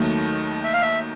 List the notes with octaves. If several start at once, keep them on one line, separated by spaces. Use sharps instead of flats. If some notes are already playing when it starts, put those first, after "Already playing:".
Already playing: D#2 D#3 F#3 A3
E5
F5
E5